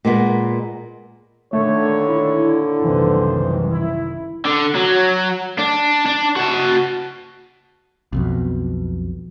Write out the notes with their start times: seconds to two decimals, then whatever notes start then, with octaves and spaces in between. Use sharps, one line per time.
0.05 A#2 G#3 B3
1.53 A#2 D3 D#3 A3 C#5
2.09 E4
2.84 F#1 C2 D#3 E3 C5
3.72 E4
4.45 D3
4.75 F#3
5.59 D4
6.06 D4
6.36 F#4 A5
8.13 B1 F2 B2